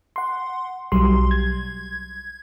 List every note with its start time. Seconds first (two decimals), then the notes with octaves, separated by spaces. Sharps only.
0.16 F#5 C6
0.92 B1 F#3 G3 C6
1.31 G#6